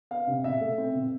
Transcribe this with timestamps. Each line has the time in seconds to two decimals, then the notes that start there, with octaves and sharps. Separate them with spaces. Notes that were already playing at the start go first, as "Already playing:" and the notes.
0.11 B3 F5
0.27 C3
0.44 B2 E5
0.61 A3
0.78 C4
0.95 B2